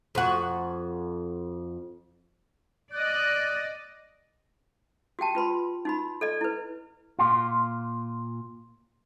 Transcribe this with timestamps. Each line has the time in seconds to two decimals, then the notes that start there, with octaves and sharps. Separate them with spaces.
0.15 F2 F#4
2.93 D5 D#5 F#6
5.19 F#4 G4 G5 A5
5.35 F4 B4 B5 C6
5.85 D#4 F#4 B5
6.21 A4 D5 D#5
6.41 E4 B4
7.19 A#2 F4